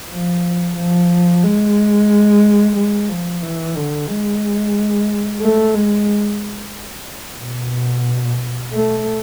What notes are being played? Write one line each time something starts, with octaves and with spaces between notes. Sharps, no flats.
F3
F3
G#3
G#3
F3
E3
D3
G#3
A3
G#3
B2
A3